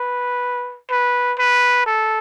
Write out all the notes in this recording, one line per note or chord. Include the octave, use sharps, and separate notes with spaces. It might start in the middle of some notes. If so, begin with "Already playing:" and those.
Already playing: B4
B4
B4
A4